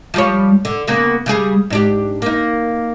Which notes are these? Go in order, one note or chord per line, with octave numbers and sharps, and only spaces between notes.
F3 G3 C#5
D3
C#3 A#3 B3
C#3 G3 G#4
G#2 D4 G4
A#3 D#4